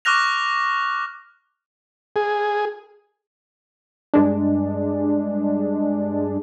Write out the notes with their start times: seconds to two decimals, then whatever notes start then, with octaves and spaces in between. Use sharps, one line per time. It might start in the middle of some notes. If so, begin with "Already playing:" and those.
0.05 C#6 D6 F6 F#6 A#6 F7
2.16 G#4
4.14 G2 G#3 D4